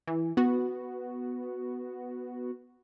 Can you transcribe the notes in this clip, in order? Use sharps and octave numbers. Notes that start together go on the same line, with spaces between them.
E3
B3 F#4